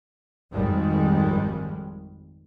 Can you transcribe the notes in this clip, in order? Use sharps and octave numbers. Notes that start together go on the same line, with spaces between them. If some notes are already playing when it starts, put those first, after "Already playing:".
G#1 F2 G#2 D#3 G3 G#3